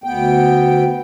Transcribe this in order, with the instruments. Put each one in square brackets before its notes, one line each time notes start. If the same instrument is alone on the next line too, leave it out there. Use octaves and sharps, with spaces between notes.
[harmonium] D2 B3 G5